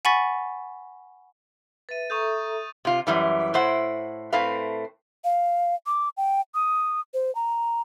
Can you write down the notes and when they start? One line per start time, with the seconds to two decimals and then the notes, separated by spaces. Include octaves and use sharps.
0.05 F#5 G#5 B5 C#6 A6 B6
1.89 B4 E5 A6 D#7
2.10 A4 E5 A#5 C#6 D#6 G6
2.85 C3 F4
3.07 F#2 E3 G3
3.54 A2 E4 C5 F#5
4.33 A2 A3 C4 B4 F5
5.24 F5
5.86 D6
6.17 G5
6.55 D#6
7.14 C5
7.35 A#5